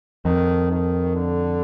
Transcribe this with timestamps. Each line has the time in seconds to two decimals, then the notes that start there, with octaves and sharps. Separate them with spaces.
0.25 F2 D#3
0.72 D#3
1.16 D3